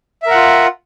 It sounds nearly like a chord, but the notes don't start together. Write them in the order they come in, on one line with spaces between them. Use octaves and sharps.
E5 A#4 F#5 F4